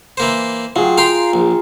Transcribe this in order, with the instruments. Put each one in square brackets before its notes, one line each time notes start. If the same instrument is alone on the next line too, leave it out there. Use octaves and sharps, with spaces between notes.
[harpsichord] E3 A#3 C5
[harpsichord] F#3 [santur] F4 G#4 G5
[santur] A#4 [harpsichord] F5 G5 C6
[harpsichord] A#1